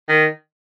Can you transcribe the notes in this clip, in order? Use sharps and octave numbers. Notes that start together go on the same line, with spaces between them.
D#3